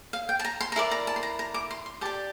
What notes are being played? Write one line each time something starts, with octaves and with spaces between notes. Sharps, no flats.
F5
G5
A5
A#5
C6
A#5
E4 A#4 D5 C6
A#5
A5
C6
A#5
A#5
D6
C6
C6
G4 D5 A5